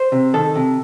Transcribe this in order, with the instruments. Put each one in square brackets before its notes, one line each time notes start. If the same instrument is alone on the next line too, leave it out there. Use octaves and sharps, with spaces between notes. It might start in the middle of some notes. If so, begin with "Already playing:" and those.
Already playing: [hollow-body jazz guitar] C5
C3
D#3 A4
C3